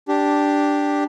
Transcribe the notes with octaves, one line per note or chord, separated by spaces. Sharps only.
D4 G4